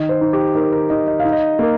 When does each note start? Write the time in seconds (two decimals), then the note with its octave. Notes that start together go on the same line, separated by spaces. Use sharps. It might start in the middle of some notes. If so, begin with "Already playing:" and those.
Already playing: D#3 D#5
0.09 C5
0.21 D#4
0.33 G4
0.55 D#4 A#4
0.72 A#4
0.90 D#4 D#5
1.08 D#5
1.19 F5
1.25 D#4
1.32 D#5
1.59 A#3